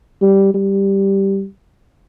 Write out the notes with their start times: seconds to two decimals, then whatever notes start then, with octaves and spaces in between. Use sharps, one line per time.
0.21 G3
0.54 G3